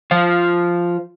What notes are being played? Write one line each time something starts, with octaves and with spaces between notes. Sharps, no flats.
F3 F4